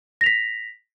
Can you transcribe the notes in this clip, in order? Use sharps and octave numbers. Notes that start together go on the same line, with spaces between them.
A#6 B6 F7